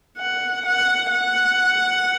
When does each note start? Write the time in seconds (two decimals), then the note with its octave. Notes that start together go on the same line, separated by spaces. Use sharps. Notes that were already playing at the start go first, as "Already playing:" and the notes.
0.18 F#5
0.65 F#5
1.11 F#5